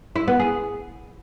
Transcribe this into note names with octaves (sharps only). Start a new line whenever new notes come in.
E4
B3
G#4